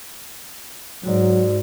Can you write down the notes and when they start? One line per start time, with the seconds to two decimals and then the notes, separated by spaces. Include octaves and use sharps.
1.04 G#2 F#3 F#4 D5